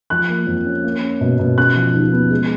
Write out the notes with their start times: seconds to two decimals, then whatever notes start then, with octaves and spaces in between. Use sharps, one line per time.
0.10 F3 F#6
0.29 A#3
0.47 F2
0.66 C#4
0.84 A#3
1.02 C#4
1.21 B2
1.39 B2
1.58 C#3 F#6
1.76 F3
1.94 D#2
2.13 B3
2.31 G#3